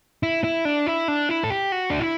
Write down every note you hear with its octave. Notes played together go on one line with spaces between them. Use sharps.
E4
E4
D4
E4
D4
E4
A4
G4
F#4
D4
E4